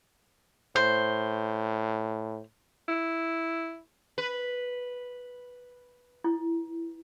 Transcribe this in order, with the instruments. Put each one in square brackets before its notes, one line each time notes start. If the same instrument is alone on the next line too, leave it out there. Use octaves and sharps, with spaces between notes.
[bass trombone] A2 [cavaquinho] C5
[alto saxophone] E4
[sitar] B4
[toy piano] E4